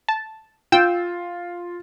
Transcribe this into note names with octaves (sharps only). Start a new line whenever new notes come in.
A5
F4 G5 E6